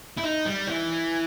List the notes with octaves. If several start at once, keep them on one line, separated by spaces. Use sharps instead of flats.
E4
D#4
G3
E3